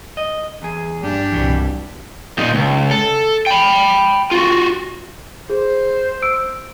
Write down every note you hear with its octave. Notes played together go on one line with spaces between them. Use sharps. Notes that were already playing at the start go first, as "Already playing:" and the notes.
D#5
E2 G#4
G2 D4 G4
C2 B2 E3 F#3 G3
A#2 D#4
C#2
A4
G5 B5
F4 F#4
G#4 C5
E6 D7